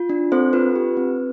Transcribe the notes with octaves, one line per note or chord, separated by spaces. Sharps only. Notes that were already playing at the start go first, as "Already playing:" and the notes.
Already playing: F4
D4
C4 A4 C5
F4 B4
G4
C4